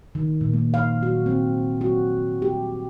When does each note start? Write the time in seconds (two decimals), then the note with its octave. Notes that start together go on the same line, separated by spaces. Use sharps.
0.15 D#3
0.41 A#2
0.54 A#3
0.74 F5
1.03 F#4
1.26 C4
1.81 F#4
2.42 G4